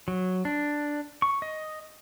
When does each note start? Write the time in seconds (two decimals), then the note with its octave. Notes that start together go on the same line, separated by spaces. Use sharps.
0.08 F#3
0.45 D4
1.22 C#6
1.42 D#5